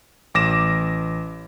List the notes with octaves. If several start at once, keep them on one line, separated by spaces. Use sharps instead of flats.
A1 D6 A#6 E7